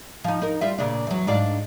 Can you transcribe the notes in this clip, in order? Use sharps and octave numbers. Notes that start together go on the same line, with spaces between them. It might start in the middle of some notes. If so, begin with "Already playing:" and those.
F3 D#4
D#4 A#4
G3 F4 E5
A#2 C#3 D4
E2 F#3
G#2 D4 F5